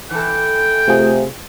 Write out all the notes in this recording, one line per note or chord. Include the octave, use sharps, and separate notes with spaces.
E3 A4 G5
C3 A3 F4 G#4